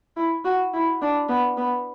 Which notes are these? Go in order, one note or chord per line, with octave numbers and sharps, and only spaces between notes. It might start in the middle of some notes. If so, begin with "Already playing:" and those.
E4
F#4
E4
D4
B3
B3